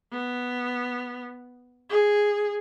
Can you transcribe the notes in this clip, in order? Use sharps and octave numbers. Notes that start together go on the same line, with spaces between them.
B3
G#4